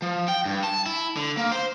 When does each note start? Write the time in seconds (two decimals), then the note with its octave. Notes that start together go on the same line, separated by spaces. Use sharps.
0.02 F3
0.28 G5
0.46 G2
0.63 A5
0.86 E4
1.17 D3
1.37 A#3
1.52 C5